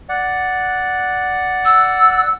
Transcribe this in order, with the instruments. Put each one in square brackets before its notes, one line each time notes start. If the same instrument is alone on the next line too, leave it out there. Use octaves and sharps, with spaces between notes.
[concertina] D5 F#5
[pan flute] E6